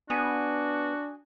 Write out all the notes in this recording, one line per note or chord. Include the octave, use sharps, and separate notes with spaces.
B3 D4 F#4 G#4